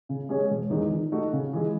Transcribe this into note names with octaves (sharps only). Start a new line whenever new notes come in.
C#3
G#3 C#4 G#4 C#5
E1
E2 D#3 G#3 D#4
D#3
A3 D#4 F#4
C#3
E3 G#3